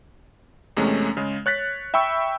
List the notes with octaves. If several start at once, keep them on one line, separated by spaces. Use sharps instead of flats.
E2 C3 G#3 A3 C#4
C#3 G#3
C#5 F#6 A6 B6
E5 G5 B5 C#6 E6